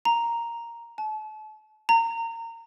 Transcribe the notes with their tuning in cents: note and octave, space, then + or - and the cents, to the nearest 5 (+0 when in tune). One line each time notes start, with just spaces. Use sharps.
A#5 +0
A5 -35
A#5 -25